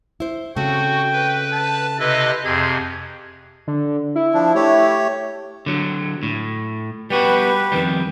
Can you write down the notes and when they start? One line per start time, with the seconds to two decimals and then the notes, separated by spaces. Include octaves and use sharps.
0.20 E4 C5
0.56 C#3 A3 C4 F#4 G5
1.13 B4
1.52 A5
1.99 C3 E4 B4 D#5
2.45 F2 C3 G#4
3.67 D3
4.16 E4
4.34 F3 D4
4.55 A3 G4 C#5
5.66 D3 F#3
6.23 A2
7.10 G3 B3 F#4 G4 B4
7.72 F2 D#3 G3